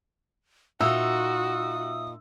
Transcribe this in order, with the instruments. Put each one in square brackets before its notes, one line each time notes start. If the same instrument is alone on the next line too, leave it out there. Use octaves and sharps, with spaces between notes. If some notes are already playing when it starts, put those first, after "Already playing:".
[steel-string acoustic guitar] A#2 D#4 F4 [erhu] F#4 [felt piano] E5 E6 [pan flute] D#6